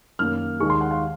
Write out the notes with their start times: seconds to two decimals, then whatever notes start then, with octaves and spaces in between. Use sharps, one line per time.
0.19 F#2 D#3 A#3 F6
0.60 D#2 D#3 G#3 C#6
0.70 C6
0.81 F#5
0.91 F5